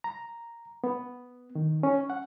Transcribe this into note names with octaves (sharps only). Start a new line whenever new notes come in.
A#5
B3
D#3
C#4
F#5